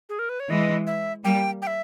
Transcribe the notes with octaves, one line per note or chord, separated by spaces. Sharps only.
G#4
A#4
B4
C#5
E3 G#3 D#5
E5
G3 A#3 G5
G5
E5